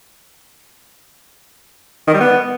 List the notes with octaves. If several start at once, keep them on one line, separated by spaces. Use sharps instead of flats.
D#3
G3
B3